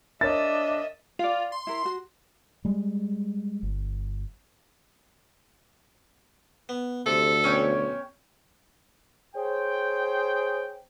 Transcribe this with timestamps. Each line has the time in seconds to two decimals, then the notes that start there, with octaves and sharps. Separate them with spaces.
0.21 D4 A#4 C#5 D#5 E5 A6
1.19 F4 D5 F5
1.52 C6
1.67 E4 A#4
1.85 F#4
2.65 G3 G#3
3.63 G1
6.69 B3
7.06 D2 C3 A4
7.44 B1 C#4 C#5 G5
9.36 G#4 C5 C#5 G5